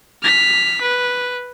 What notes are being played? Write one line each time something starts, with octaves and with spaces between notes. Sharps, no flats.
F6 B6
B4